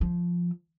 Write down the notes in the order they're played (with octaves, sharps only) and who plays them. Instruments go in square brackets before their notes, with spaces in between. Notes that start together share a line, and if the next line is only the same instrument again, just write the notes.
[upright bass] F3